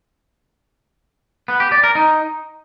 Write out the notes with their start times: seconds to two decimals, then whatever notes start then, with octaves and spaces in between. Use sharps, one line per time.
1.48 B3
1.60 G4
1.72 D5
1.84 A#4
1.95 D#4